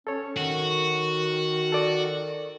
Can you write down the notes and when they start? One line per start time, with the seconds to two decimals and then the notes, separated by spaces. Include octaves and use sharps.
0.07 C#4 A4 C#5
0.37 D#3 F#4
1.72 A4 D5